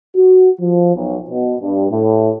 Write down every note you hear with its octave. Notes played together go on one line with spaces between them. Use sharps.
F#4
F3
B1
B2
G2
A2